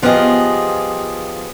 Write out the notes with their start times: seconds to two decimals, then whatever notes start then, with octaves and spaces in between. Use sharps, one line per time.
0.02 F3 B3 F4 G4 G#4 D#5